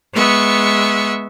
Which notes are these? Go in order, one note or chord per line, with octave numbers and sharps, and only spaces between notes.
G#3 B3 E5 C#6